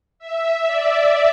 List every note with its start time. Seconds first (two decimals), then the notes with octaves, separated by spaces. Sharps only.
0.19 E5
0.66 D5